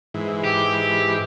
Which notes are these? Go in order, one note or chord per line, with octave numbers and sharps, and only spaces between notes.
G#2 E3
G4